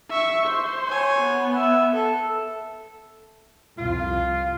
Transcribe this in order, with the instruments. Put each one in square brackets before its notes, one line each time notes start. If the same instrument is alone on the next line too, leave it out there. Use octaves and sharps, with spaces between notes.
[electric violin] E5 C#6
C5
[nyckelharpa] C#5 G#5
[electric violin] B3
[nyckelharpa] E5
A4
[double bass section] C2 F2 [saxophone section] F4